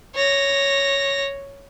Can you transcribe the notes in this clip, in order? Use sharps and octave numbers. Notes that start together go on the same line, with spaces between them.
C#5 A#6